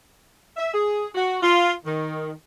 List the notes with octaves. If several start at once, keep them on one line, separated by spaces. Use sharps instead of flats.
E5
G#4
F#4
F4
D#3